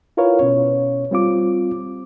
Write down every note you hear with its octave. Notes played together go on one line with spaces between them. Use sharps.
E4 F4 A#4 B4 C#5 F5
B2 C#4 C#5
G3 C4 F4 D6